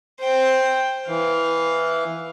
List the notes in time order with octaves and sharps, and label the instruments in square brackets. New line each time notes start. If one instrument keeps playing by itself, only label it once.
[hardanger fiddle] C5 G5
[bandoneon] E3 [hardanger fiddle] F5